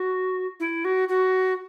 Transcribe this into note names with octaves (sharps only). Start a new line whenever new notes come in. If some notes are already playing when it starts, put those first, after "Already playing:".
Already playing: F#4
E4
F#4
F#4